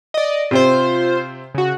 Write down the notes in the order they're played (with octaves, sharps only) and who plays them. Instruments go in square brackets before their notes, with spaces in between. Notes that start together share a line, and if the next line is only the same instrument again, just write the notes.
[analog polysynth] D5 D#5
[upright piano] C3 C4 [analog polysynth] F4 C5
[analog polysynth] C#3 F#4